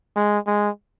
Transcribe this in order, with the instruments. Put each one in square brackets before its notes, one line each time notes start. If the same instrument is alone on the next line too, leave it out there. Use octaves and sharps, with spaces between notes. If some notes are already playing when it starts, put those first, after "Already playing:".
[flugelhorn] G#3
G#3